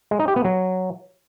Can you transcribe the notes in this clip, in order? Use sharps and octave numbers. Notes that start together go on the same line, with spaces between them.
G#3
D#4
G4
B3
F#3